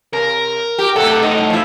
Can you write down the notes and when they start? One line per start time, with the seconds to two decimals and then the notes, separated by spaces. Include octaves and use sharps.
0.13 C3 A#4
0.78 G4
0.96 A2 C3 A4 F#5
1.23 D#4
1.50 F3 E4